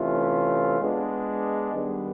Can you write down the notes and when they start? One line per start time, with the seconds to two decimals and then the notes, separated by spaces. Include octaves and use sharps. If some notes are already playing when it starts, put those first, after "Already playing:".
Already playing: C3 E3 A3 C#4 F4
0.80 G#3 B3 D4
1.74 D#3 G3 B3